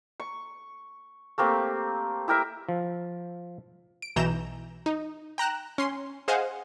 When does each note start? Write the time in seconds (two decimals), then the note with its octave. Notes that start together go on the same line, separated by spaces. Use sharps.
0.20 C#6
1.38 A3 A#3 C4 G4
2.28 E4 G4 A#4 E5
2.69 F3
4.02 D7
4.16 B1 B2 E3 A#5 G6 E7
4.86 D#4
5.38 G5 A#5 F#6 E7
5.78 C#4 C6
6.28 G#4 C5 D#5 F5 F#5 G#5